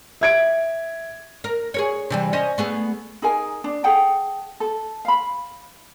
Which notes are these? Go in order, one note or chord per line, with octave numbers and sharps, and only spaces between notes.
E5 G#6 D7
A#4
G#4 A#4 C#5
C3 E3 G3
C#4 C5 D#5
A3 B3 G#4
D#4 G#4 A#4 G#5
D4
G#4 A4 F#5 G5
A4
F5 B5